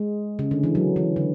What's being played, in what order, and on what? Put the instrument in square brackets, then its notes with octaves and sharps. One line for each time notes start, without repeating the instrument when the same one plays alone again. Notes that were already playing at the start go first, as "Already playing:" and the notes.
Already playing: [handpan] G#3
C#3
D3
E3
F#3
E3
D3